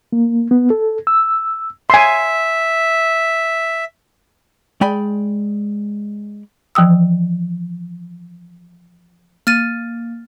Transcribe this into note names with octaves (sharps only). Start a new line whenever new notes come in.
A#3
B3
A4
E6
E5 G#5 C6
G#3 D5 G5 G#5 B5
E3 F3 G5 D#6 E6
A#3 F6 A6 D#7